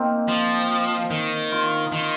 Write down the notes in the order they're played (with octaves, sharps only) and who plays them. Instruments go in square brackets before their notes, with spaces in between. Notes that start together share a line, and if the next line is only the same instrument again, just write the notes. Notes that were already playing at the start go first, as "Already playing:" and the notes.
Already playing: [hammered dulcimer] A#3 C4 D#4 A#4
[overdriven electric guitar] F3
D#3
[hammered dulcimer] F4
[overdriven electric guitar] D#3